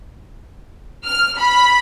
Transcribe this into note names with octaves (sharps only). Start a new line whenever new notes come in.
F6
B5